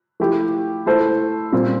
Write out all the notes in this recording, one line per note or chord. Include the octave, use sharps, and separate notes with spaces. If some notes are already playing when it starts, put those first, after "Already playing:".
F3 A3 E4 G4
A3 E4 A4 C5
A#2 G3 C4 F4